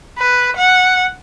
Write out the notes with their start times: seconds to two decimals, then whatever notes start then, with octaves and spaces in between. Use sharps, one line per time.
0.18 B4
0.57 F#5